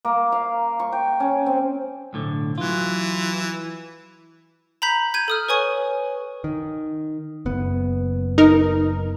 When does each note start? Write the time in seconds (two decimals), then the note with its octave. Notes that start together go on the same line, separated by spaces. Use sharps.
0.05 A#3
0.32 F5
0.80 C#6
0.92 G5
1.20 C#4
1.46 C4
2.13 B1 A2 D3
2.58 E3 F#3 F4
4.82 A#5 B5 G6 B6
5.14 G6 G#6 D#7
5.28 A4 D#6 F6
5.48 B4 C#5 G#5 C#6 D#6
6.44 D#3
7.46 F#1 B3
8.38 D#4 A#4